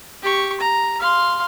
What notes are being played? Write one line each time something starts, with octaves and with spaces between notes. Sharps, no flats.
G4 C#6
A#5
F5 C6